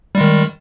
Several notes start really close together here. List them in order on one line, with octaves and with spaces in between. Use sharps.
G3 G#3 D#3